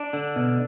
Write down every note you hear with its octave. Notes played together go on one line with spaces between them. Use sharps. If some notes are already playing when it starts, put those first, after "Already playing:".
Already playing: D4 D5
D3
B2